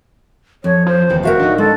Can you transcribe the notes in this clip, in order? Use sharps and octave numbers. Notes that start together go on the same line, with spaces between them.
F2 C#5
F3 C5
D1 D#2 C3 E3
F#4 A#4 E5 F5
D4 D#4
G#3 A4